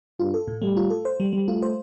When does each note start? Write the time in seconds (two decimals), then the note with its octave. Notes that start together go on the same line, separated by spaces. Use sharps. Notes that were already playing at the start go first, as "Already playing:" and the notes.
0.20 G2 F4
0.34 A4
0.48 A2
0.62 G3 A3
0.77 F4
0.90 A4
1.05 C5
1.20 G3
1.33 G3
1.48 A3 F4
1.62 C5